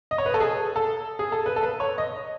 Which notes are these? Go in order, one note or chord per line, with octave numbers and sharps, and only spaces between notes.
D#5
C#5
B4
A4
G#4
A4
G#4
A4
B4
A4
B4
C#5
D#5